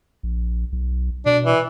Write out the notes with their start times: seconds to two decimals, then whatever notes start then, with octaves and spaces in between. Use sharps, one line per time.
0.23 A#1
0.72 B1
1.26 B2 D4
1.45 E3